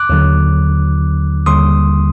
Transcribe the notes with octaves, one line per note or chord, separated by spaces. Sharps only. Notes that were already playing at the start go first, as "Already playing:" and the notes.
Already playing: D6 F#6
D#2 D3 F#3
D#2 D3 G3 C6 D#6